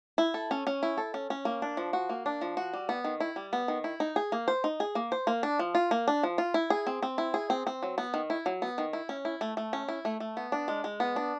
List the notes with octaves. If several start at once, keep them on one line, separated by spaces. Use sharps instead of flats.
E4
A4
C#4
C#4
E4
A4
C#4
C#4
A#3
D4
F3
F#4
A#3
D4
F3
F#4
G3
B3
D#3
E4
G3
B3
D#3
E4
D#4
G#4
A#3
C5
D#4
G#4
A#3
C5
A#3
D4
F3
F4
A#3
D4
F3
F4
E4
G#4
C4
C4
E4
G#4
C4
C4
F#3
B3
D#3
E4
F#3
B3
D#3
E4
C#4
E4
A3
A3
C#4
E4
A3
A3
B3
D4
G#3
G#3
B3
D4